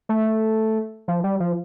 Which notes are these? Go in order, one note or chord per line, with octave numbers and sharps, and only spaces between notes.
A3
F3
G3
F3